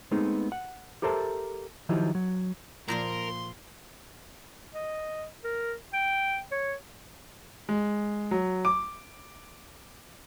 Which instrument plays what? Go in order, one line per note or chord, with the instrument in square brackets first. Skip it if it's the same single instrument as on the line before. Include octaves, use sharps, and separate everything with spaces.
[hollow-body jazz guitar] G#3 A3 B3 C4 D#4 G#4
F#5
G4 A4 A#4 C5 E5 A5
D#3 F3 F#3 D#4 E4 G4
F#3
[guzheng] A#2 F3 A#3 [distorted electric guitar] A#4 [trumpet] C6
[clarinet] D#5
A#4
G5
C#5
[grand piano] G#3
F#3
D6